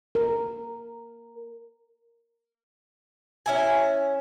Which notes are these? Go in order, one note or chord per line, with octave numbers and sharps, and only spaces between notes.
A#4
C#4 E4 G#5